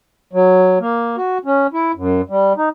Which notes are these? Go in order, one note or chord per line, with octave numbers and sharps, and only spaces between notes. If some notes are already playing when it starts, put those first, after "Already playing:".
F#3
A#3
F#4
C#4
E4
F#2
G3
D#4